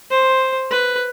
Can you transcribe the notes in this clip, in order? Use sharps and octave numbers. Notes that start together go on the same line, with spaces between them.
C5
B4